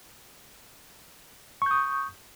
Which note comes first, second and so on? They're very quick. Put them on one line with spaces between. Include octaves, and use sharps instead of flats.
C#6 G6 D#6